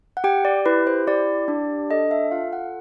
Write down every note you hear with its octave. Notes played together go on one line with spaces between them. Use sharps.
F#5
G4 G5
D5
E4 B4
C5
G4 D5
D4
A4 D#5
E5
F4 F5
F#5